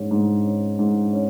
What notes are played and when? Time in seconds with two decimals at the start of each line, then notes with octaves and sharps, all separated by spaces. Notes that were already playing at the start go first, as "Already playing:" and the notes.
Already playing: G#2 C#4
0.11 G#2
0.45 C#4
0.79 G#2
1.13 C#4